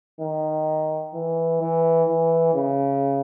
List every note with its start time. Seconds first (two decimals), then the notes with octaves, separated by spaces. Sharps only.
0.21 D#3
1.14 E3
1.61 E3
2.08 E3
2.55 C#3